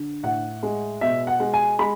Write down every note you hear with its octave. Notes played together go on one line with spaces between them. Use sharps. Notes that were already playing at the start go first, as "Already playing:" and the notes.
Already playing: D3
A2 F#5
G#3
B2 E5
F#5
G#3
G#5
G#3 B5